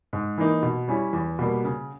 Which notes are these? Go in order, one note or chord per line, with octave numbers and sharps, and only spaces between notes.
G#2
E3 A#3 D#4
B2
G3 C#4 E4
E2
B2 G3 A#3
C#3